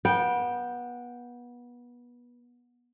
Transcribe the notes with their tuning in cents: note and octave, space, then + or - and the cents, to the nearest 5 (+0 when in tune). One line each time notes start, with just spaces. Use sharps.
B3 -25 G5 +0